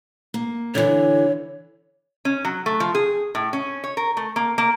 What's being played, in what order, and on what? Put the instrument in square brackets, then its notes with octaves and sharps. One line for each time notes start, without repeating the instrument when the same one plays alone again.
[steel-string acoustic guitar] A#3
[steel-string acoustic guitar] D3 E3 [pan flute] C#5
[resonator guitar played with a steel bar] C#4
F#3
A3
F3
G#4
A2
C#4
C#5
A#4
A3
A#3
A#3